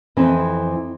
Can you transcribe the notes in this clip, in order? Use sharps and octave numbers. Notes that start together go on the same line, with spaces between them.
F2 E3 C4 D#5